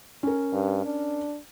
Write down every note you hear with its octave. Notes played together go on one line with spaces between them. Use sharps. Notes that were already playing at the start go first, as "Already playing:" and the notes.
C#4 A#4
G2
D4